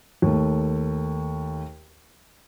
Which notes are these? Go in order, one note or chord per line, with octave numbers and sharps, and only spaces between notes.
D#2 A3